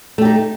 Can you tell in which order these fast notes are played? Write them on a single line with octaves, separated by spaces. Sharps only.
A3 G4 D#4